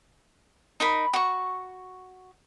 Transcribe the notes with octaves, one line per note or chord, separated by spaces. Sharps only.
D#4 A#4 B5
F#4 C#6